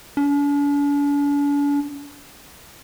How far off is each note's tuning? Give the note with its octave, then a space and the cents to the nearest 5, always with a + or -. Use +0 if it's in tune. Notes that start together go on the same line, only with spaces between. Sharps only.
D4 -45